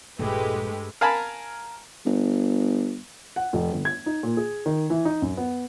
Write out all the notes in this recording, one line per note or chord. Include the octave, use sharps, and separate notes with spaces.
A#1 G2 G#3 A3 G4 B4
A#4 F5 G#5 A5 B5
G1
F#5
F1
G1
G#6
D#4
A#2
G#4
D#3
E3
D#4
F#2
B3